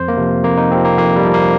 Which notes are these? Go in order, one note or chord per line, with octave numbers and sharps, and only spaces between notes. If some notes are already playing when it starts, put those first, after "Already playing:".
Already playing: F2 C5
A#3
C3 F3
F2 A#3
D#4
C3 F3 C4
A#3
F2 A#3
G3
C3 F3
A#3